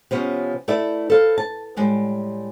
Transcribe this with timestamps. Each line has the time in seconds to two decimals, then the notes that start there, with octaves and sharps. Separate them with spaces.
0.11 C3 F3 B3 C#4
0.68 A3 E4 B4 D5 E5
1.10 A4 B4 C5 F5
1.38 A5
1.77 A2 G3 G#3